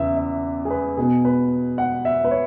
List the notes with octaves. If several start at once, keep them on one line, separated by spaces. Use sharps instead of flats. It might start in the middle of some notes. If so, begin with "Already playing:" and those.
Already playing: E2 C#3 E3 B4 E5
E5
G#4
B4
B2 B3 G#4
B4
F#5
E5
B4
C#5